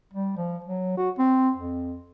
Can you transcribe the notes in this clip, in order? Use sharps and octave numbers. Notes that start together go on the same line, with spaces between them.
G3
F3
F#3
F#4
C4
F2